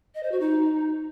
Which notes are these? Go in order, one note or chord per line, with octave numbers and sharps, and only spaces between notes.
D#5
C5
F#4
D#4